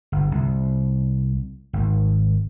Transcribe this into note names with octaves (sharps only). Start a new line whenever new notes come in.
G1
C2
G#1